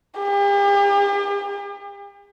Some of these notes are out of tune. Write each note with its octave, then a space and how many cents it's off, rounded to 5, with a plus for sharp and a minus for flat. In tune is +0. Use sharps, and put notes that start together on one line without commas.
G4 +40